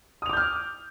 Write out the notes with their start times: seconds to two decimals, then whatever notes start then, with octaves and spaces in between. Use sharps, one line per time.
0.22 D#6
0.26 F7
0.29 D6
0.33 G6
0.37 F6